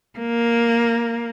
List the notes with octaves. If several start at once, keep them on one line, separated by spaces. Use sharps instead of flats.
A#3